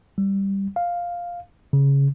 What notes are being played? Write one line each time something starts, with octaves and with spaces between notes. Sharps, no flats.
G3
F5
C#3